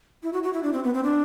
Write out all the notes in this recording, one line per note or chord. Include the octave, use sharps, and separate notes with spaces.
E4
F#4
F#4
E4
D4
C4
B3
C4
D4